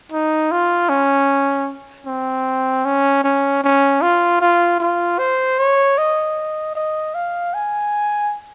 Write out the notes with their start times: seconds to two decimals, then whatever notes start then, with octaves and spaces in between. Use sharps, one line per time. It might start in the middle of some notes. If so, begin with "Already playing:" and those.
0.12 D#4
0.51 F4
0.90 C#4
2.07 C4
2.85 C#4
3.24 C#4
3.64 C#4
4.02 F4
4.41 F4
4.80 F4
5.19 C5
5.59 C#5
5.98 D#5
6.75 D#5
7.15 F5
7.54 G#5